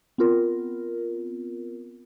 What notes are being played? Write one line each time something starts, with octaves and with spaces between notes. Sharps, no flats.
B3 C4 F4 A#4